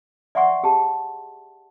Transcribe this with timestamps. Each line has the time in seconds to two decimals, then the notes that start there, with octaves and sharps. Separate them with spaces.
0.35 D5 E5 F#5 C6 C#6
0.64 G4 G#4 A5